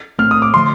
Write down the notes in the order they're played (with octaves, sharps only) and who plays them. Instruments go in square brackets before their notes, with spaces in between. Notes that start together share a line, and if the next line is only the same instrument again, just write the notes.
[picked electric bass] A2 A3 C4 [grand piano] F6
[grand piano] D#6
D6
[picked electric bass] D3 F3 A3 [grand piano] C6